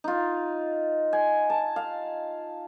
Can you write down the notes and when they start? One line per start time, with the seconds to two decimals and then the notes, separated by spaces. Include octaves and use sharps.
0.04 D#4 F4
1.13 G#5
1.50 A5
1.76 F5